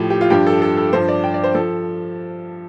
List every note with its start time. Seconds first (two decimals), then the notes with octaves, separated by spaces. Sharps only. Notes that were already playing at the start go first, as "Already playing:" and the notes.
Already playing: A2 F3 G4
0.10 G4
0.21 F4
0.30 G2 F3 G4
0.47 A4
0.62 A4
0.77 A4
0.93 G2 F3 C5
1.08 D5
1.24 G5
1.34 D5
1.44 C5
1.55 F3 A4